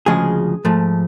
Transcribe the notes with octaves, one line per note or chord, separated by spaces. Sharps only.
D2 C#3 F3 G#3 G#4
G#2 F3 A3